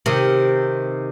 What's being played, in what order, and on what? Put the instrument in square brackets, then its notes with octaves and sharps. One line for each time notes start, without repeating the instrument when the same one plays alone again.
[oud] C3 D#3